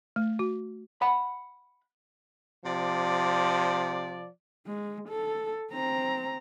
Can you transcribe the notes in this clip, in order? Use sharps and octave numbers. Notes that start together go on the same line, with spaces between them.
A3
F#4
F#5 B5
C3 F3 D5
G#3
A4
C4 A#5